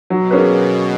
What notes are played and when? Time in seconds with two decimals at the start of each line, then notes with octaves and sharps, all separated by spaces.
0.10 B2 F#3
0.31 A#3 C#4 G#4 B4